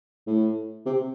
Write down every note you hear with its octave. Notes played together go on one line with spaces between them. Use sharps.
A2
C3